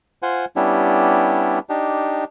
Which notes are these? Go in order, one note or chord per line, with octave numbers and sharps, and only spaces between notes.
F4 C5 F#5 G#5
G3 B3 C#4 D4 E4 G4
D4 D#4 G4